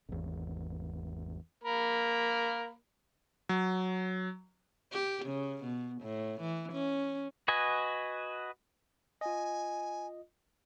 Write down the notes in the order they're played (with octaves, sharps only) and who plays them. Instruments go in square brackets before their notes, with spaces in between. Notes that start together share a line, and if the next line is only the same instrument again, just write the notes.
[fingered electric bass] G#1 E2
[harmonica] A#3 A#4 B5
[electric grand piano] F#3
[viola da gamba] G4
C#3
B2
A2
E3
C#4
[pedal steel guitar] F#4 B4 D#5 G#5
[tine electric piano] F4 D#5 [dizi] G#5